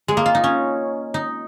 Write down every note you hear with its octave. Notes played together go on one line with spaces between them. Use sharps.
G#3
A#3
F4
D#4
C#4
D#4